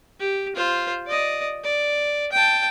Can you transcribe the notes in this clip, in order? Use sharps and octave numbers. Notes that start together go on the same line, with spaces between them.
G4
F4 C5
D5 D#5
D5
G5 A5